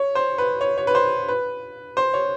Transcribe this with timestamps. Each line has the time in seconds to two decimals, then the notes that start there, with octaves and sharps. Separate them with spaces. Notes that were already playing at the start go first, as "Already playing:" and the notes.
Already playing: C#5
0.15 C5
0.38 B4
0.61 C#5
0.78 C#5
0.87 B4
0.95 C5
1.28 B4
1.97 C5
2.14 C#5